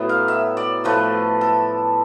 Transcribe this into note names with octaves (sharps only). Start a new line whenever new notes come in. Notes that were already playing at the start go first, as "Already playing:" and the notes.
Already playing: A2 F#3 B3 E4
F5
E5
D5
A2 F3 A3 B4
A4